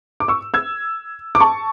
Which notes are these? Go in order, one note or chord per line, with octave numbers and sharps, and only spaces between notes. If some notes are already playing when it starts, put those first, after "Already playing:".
D6
C#6 E6
E6 G#6
D6
A5 C#6